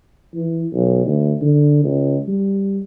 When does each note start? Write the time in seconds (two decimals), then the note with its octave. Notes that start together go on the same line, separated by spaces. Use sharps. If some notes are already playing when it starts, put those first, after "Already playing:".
0.34 E3
0.73 B1
1.05 D2
1.41 D3
1.84 C#2
2.28 G3